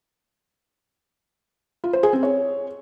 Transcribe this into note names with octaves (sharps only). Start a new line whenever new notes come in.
F4
C5
G#4
C4
C#5